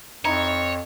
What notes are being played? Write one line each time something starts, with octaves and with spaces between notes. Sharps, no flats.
F2 D#4 E4 C#5